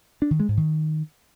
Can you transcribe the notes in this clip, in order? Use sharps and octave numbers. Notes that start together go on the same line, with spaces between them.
D4
D#3
G#3
G#2
D#3